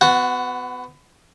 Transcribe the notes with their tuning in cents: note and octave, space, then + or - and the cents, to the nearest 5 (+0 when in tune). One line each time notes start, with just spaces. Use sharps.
B3 +25 F#4 +0 F#5 +0